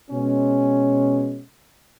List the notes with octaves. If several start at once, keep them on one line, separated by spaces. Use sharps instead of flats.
B2 G#3 C#4